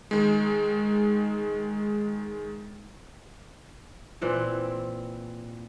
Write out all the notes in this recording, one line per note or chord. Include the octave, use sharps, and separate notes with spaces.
D#3 G#3
A#2 E3 C4